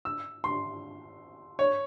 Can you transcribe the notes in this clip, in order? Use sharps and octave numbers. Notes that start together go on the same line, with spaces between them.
E6
C6
C#5